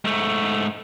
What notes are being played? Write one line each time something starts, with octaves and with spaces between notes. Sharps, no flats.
G#2 A3